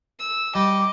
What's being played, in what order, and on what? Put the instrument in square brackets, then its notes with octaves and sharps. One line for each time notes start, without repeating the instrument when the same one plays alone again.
[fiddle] E6
[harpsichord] G3 [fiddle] D#5 [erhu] D6